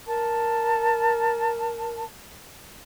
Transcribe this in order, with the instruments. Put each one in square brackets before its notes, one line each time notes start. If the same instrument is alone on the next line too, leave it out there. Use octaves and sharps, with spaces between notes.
[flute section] A#4 A5